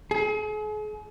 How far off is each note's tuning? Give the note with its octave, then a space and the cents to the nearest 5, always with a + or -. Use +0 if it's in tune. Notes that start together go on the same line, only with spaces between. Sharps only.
G#4 +40